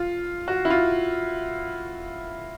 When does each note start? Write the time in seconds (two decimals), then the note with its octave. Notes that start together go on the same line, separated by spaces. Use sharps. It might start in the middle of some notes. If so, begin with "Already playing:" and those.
Already playing: F4
0.48 F#4
0.65 E4
0.70 F4